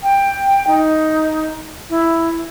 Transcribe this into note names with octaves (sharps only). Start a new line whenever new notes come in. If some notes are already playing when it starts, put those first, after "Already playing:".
G5
D#4
E4